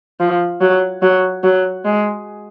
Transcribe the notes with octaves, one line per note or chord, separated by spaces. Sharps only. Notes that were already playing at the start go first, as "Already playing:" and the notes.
F3
F#3
F#3
F#3
G#3